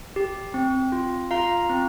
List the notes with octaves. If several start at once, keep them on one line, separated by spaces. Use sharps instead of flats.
G4
C4
F4
F4 F5 A#5
C4